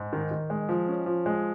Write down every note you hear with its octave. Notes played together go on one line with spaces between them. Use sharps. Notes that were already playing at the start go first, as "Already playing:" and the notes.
Already playing: G#2
D#3
D#3
G#3
F3
C#4
F3
G#3